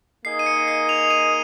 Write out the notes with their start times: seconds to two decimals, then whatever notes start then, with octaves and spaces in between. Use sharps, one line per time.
0.24 A#3 D#4 G#4 D#5 C7
0.39 D#7
0.46 C#7
0.68 C7
0.89 F7
1.10 D#7